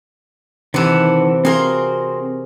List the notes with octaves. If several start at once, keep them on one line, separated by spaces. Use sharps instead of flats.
C3 D#3 E3 F#5 A5
C4 F#4 G#4 A#4 F5 C6